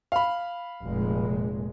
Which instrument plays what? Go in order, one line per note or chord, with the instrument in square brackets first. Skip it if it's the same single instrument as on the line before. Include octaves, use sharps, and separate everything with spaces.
[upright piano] F5 B5
[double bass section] F1 A#2 G#3